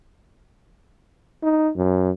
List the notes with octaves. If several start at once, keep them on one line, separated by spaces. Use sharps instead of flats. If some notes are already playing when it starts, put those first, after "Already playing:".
D#4
F#2